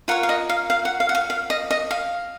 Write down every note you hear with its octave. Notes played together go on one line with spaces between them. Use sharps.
F4 A#4 C#5 F#5
F5
D#5
F5
F5
F#5
F5
F#5
F5
F5
D#5
D#5
F5